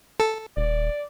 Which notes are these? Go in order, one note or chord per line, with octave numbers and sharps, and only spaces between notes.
A4
D#1 D5